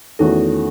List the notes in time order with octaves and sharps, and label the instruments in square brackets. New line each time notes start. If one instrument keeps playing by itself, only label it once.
[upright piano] E2 D#3 A3 C#4 F#4 [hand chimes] A4